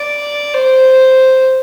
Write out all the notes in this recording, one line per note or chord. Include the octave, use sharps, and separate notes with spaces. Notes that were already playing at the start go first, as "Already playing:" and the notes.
Already playing: D5
C5